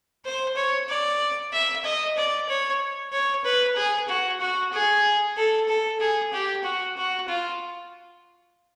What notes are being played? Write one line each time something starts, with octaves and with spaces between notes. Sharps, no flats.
C5
C#5
D5
E5
D#5
D5
C#5
C#5
B4
G#4
F#4
F#4
G#4
A4
A4
G#4
G4
F#4
F#4
F4